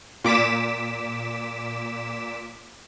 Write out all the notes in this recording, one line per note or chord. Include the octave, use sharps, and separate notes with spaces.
A#2 D6 B6 E7